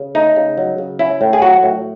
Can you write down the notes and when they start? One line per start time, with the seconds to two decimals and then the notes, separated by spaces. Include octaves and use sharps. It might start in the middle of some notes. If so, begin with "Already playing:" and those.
Already playing: C#3
0.15 A3 D#4
0.36 C#3
0.58 F#3
0.78 C#3
0.99 C#4 E4
1.21 A2
1.33 G#4
1.42 F#3 F#4
1.63 A2